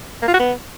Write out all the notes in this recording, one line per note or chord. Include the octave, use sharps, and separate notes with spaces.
A#3
F4
F#4
B3